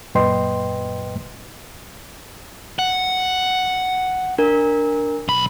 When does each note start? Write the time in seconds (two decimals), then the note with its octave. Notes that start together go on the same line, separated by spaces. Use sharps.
0.15 F#2 A#2 B4 D#5 G5 C6
2.79 F#5
4.38 D4 A#4
5.28 B1 B5